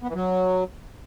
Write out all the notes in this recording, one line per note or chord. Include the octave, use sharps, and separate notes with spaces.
B3
E3
F#3